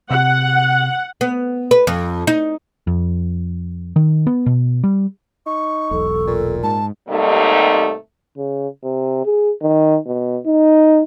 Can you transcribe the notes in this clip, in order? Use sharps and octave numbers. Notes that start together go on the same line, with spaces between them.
C3 F#5
B3
B4
F2
D#4
F2
D#3
B3
B2
G3
D#4 C#6
E1 B1 A4
A#2
G#2 A5
G#2 C3 G3 A3 A#3 D#4
C#3
C3
G#4
D#3
B2
D#4